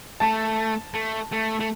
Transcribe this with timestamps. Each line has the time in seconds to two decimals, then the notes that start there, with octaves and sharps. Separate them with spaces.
0.20 A3 A5
0.94 A3
1.32 A3
1.60 A3